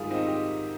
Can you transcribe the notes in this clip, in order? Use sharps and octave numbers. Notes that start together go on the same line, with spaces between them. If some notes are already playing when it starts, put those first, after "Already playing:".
Already playing: G#2 D#3 G3 F4 G#4 A#4
C4 D#4
D#4 G4